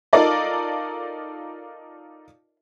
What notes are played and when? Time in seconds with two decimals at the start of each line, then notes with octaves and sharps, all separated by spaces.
0.13 D#4 F4 A4 A#4 D5 D#5